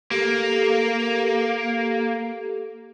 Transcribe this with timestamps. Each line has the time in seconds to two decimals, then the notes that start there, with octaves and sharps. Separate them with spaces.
0.11 A#3 G4 A4